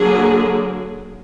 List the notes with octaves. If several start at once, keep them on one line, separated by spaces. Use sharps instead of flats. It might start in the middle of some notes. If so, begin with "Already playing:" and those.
Already playing: D3 F#3 A#3 G#4